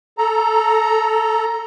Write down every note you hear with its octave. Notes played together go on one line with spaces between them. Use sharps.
A4 A#5